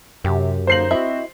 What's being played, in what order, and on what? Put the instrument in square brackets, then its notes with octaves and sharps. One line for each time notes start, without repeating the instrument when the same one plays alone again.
[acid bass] F#2 [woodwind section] C3 [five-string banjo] G4
[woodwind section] D3 A#3 D#4 [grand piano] C5 C7 F#7
[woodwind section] C4 F#4 [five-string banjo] E4 D#5 E5